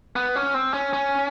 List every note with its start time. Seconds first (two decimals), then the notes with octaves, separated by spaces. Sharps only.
0.16 B3
0.36 C#4
0.54 C4
0.73 C#4
0.93 C#4